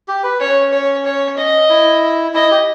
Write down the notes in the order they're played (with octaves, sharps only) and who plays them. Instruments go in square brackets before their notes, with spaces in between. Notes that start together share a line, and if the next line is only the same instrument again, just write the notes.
[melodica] G4
B4
[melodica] C#4 [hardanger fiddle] C#5
[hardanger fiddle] C#5
C#5
D#5
[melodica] E4
[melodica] E4 [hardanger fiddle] D#5
[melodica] G4